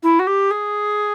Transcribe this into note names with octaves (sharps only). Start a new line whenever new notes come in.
E4
F#4
G4
G#4